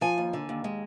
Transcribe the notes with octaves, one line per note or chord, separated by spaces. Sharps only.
F3 G#5
D#2
D3
D#2
G#3